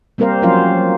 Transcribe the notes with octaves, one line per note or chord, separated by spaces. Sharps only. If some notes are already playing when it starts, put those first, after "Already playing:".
G3 A#3 C4 A#4 C5 F5
F3 F#3 C#4 F4 C5 F5